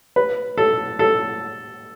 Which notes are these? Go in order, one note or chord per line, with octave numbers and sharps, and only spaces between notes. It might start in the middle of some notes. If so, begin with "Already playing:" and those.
B4
A4
A4